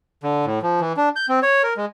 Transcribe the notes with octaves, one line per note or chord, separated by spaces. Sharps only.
D3
A2
F3
E3
D4
G6
C4
C#5
A#4
G#3